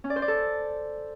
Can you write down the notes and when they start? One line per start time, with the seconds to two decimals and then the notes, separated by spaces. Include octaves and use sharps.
0.04 C#4
0.10 D5
0.16 C5
0.22 D5
0.28 A4